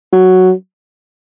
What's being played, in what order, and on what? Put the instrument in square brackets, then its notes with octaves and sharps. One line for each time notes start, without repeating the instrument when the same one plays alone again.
[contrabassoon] F#3